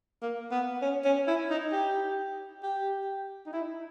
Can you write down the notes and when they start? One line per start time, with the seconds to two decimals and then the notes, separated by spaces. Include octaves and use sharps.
0.22 A#3
0.51 B3
0.82 C#4
1.04 C#4
1.27 E4
1.50 D#4
1.72 G4
2.63 G4
3.46 D#4
3.53 E4